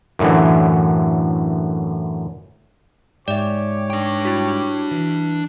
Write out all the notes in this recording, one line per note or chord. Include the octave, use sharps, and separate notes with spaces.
F#2 A2 D3 E3
G#2 G4 C#5 D5 E5 D6
D4 G5
E4 F#4
E3